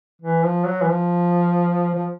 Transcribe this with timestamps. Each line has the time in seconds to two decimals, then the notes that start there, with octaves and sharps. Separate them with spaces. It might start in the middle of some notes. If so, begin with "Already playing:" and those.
0.22 E3
0.44 F3
0.67 F#3
0.82 E3
0.90 F3
1.95 F3